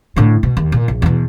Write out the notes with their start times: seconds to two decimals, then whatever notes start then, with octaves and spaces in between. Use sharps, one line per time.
0.16 A2 D3
0.43 B2
0.57 D#2
0.72 A#2
0.88 A#1
1.02 E2 B2